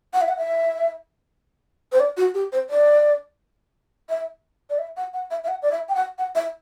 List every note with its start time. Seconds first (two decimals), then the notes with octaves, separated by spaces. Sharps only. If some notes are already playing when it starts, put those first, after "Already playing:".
0.13 F#5
0.21 E5
0.28 F#5
0.37 E5
1.92 C5
2.00 D5
2.17 F#4
2.34 G4
2.52 C5
2.69 D5
4.09 E5
4.70 D5
4.78 E5
4.97 F#5
5.13 F#5
5.30 E5
5.44 E5
5.48 F#5
5.62 D5
5.71 E5
5.88 G5
5.95 F#5
6.18 F#5
6.35 E5